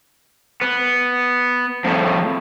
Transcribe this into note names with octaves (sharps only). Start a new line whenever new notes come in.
B3
F2 A2